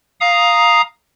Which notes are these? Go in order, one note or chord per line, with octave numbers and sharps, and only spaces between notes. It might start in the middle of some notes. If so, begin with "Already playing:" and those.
F5 A#5 D#6